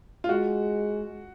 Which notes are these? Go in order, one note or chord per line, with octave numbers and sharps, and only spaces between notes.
F4
G#3 F#4